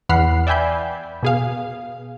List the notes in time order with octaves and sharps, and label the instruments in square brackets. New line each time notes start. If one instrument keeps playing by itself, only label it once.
[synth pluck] E2 E3 F#5 B5 F6 C7
D5 E5 G5 G#5 B5 G6
B2 G#4 F5